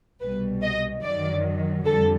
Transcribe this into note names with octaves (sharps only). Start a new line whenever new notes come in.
C2 B2 G3 B4
D#5
F#2 D#3 F#3 D5
F2 D3 G3 A4